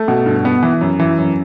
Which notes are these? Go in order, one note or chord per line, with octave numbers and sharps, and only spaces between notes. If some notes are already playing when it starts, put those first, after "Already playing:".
Already playing: A3
B2
G2
B3
E3
F#2
E3
F#2